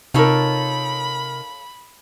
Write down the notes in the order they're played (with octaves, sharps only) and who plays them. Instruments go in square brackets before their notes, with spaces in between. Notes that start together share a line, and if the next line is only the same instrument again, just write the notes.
[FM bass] C3 [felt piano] D#4 A#4 [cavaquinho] F4 A4 C#5 [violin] B5